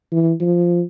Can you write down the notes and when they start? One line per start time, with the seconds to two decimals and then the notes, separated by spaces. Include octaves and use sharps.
0.12 E3
0.41 F3